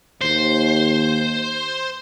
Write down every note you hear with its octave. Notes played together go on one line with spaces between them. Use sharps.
D#2 C5